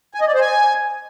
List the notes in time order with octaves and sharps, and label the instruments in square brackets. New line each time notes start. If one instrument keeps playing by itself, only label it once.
[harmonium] G#5
D#5
D5
C5
G#5